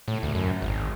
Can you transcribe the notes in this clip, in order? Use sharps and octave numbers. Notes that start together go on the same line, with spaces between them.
A2
D2
F#2
G#1